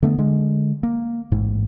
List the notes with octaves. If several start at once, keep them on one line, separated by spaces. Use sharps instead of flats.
D3 A3 B3
D3 G#3
A#3
A1 G#2